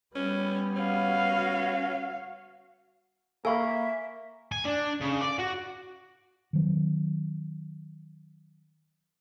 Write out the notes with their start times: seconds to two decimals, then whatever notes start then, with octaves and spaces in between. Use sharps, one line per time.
0.15 G3 B3 C#4
0.76 C#4 F#4 F5
3.45 A#3 A4 E5 F5 G#5 B5 C#6
4.52 G#5
4.65 D4
5.01 C#3
5.21 D5
5.39 F#4
6.53 D#3 F#3 C4